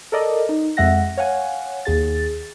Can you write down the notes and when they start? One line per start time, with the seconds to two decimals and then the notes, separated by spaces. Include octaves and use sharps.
0.12 A4 A#4 D5 D#5
0.49 D#4
0.77 F2 G#3 E5 F#5 A#6
1.17 C#5 F5 F#5 G#5
1.85 D#2 G#4 A6